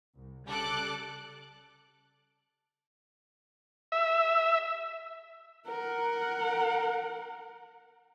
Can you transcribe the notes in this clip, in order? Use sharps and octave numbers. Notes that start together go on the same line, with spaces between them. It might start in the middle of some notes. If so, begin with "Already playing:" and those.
C2
C#3 G3 A4 D6 F#6
E5
A#4 F#5